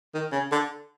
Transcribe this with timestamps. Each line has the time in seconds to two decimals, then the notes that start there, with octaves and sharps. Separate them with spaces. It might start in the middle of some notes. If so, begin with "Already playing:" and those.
0.14 D#3
0.32 C#3
0.52 D3